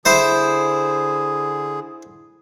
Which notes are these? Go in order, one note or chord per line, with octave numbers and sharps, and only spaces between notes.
D3 E4 G#4 C5